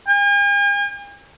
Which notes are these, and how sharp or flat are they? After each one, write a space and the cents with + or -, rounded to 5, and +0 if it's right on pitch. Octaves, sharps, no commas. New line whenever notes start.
G#5 -45